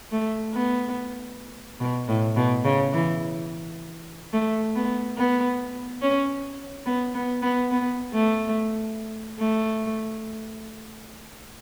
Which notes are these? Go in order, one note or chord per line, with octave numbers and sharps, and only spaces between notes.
A3
B3
B2
A2
B2
C#3
E3
A3
B3
B3
C#4
B3
B3
B3
B3
A3
A3